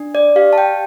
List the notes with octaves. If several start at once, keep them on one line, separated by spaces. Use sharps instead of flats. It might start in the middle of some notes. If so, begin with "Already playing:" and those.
Already playing: D4
D5
G4 F5
A5
G5